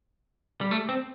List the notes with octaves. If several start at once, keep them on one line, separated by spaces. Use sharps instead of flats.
G3
A3
C4